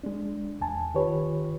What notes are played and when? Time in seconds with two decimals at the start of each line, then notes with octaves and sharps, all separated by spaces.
0.04 G#3 D4
0.61 E2 G#5 A5
0.94 D#3 F4 G4 B4 C#5